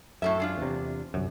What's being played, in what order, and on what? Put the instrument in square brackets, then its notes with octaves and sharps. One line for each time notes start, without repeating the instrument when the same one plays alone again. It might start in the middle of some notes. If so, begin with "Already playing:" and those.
[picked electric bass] F#2 [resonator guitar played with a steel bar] A2 A4 E5
[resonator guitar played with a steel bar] G#3 D4 F4
[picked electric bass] E2 C3
G1 C2 F#2